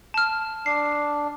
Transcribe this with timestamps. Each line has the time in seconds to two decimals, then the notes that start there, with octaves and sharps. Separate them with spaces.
0.14 A5 F6
0.66 D4 C7